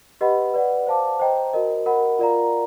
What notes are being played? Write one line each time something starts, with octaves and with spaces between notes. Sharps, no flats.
G4 B4 D#5 F#5 B5
B4 D5 F#5
C5 F5 A5 D6
C5 D#5 G5 A#5
F#4 A#4 D#5
A#4 D#5 F#5 B5
F4 A#4 D5 F5 A#5